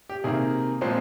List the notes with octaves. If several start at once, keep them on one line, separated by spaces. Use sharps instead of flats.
G4
C3 D#3 A#3 G#4
A#2 F3 G#3 C4